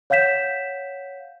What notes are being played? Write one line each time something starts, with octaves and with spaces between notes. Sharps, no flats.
C#5 F5 F#5 G6 B6 E7